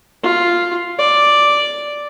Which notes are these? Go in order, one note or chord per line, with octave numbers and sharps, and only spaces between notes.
F4
D5